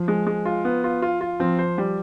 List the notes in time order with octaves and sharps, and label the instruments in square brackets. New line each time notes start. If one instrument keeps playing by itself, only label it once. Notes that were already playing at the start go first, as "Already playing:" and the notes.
Already playing: [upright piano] F3
[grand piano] G#3
G#3
F4
B3
F4
F4
F4
[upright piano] F3 [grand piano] C4
[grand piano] C5
G3